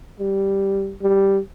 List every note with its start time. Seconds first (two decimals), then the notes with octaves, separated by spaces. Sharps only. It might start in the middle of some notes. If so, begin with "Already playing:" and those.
0.20 G3
1.02 G3